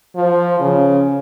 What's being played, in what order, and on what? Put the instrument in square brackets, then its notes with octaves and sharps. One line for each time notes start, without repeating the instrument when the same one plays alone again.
[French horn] F3
C#3